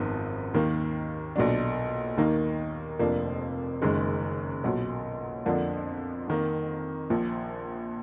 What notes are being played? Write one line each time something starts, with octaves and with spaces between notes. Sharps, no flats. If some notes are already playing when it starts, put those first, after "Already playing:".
Already playing: G#1 F#2 F3 B3 D#4
D#2 D#3 A#3
B1 A#2 F#3 D4
D#2 D#3 A#3 D#4
F1 F2 F3 A#3 D4
F#1 F#2 D#3 G#3
B1 A#2 F#3
F2 D3 F3 A#3 D4
F2 D#3 A#3
A#1 A#2 F3